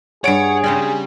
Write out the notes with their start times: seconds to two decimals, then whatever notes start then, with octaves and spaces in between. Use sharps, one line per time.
0.24 G2 G#4 C#5 D5 F#5 D7
0.64 C#3 C4 C#4 G4 D5